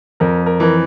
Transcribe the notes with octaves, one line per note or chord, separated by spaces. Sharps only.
F2 A#4
A#4
E3 A#4